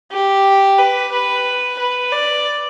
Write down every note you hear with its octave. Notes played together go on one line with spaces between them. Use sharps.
G4
B4
B4
B4
D5